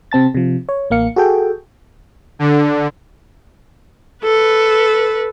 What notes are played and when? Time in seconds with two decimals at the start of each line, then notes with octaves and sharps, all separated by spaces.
0.12 C3 C4 A5 A6
0.34 C3 F3
0.69 C#5
0.90 A1 A#3 F5 C#7
1.16 F#4 G#4 A4 G5
2.39 D3
4.24 A4 B4